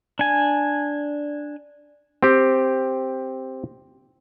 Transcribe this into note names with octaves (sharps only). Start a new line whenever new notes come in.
D4 G#5
C4 G4